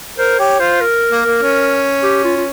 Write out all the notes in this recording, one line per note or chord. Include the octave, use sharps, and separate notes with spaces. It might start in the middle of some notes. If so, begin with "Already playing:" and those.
A#4 C5
G4 C#5
F4 C5
A#4
A#3
A#3
C#4
G4
F4
F4